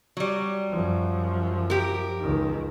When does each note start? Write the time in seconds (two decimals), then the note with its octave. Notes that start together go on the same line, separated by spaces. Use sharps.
0.17 F#3 G3
0.71 F#2 F3
1.70 G4 A#4
2.20 C#2 D#3